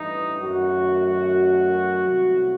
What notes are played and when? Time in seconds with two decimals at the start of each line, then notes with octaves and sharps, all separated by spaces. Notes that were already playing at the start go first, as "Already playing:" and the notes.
Already playing: A1 G2 E3 D#4
0.41 F#2 D#3 A3 F#4
2.09 C2 C3 F#3 A3